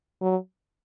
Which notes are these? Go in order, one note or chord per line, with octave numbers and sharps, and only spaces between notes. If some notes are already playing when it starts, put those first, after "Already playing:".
F#3